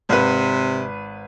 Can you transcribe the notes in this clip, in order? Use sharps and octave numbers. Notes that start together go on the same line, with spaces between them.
G#1 C3 B4